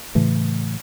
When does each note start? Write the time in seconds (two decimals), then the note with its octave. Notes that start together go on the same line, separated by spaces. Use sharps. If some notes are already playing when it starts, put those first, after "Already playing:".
0.15 A2 C#3 E3 A3